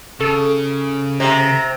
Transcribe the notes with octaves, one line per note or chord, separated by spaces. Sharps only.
C#3 A4
C3 A#5